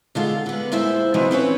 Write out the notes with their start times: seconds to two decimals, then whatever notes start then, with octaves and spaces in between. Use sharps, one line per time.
0.15 D3 G#3 F4 A4
0.46 D3 B3
0.72 A#2 G#3 E4 C5 E5
1.14 C3 E3 F3 F#4 D#5 A5
1.31 C4 C#4 B4 C#5